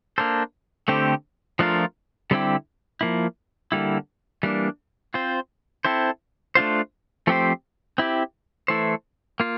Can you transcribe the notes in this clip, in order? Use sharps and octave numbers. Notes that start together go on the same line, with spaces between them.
A#3 D4 A4 C5
D3 A3 C4 G4 C5
F3 A3 D4 F4 A#4
D3 G3 C4 E4 G4
F3 A#3 E4
D3 G3 A#3 E4
E3 G3 A#3 D4
C4 F4 C5
C4 E4 A4 C5
A3 D4 F4 C5
F3 A3 C4 G4 C5
C4 E4 G4
E3 A3 E4 A4 C5
A#3 F4